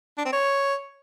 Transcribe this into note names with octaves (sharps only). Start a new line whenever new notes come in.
D4
C4
C#5